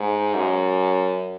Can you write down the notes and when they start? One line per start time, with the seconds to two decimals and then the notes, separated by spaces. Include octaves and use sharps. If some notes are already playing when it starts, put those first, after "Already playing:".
Already playing: G#2
0.35 F#2